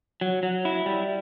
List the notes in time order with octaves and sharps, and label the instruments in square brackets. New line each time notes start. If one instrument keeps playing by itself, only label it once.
[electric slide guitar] F#3
F#3
E4
G3